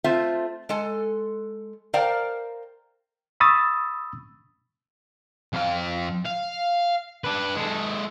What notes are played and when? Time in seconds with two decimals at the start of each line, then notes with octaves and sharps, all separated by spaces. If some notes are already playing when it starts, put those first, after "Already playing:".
0.04 A3 C4 F4 C5 E5
0.69 G#3 A4 G#5
1.94 A#4 C5 D5 F5 G5 A#5
3.40 B5 C#6 D#6 E6 A6
5.53 F2 F5
6.26 F5
7.24 D4 B4
7.56 G#3 A4